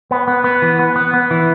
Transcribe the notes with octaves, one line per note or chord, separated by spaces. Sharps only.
B3
B3
B3
E3
B3
B3
B3
E3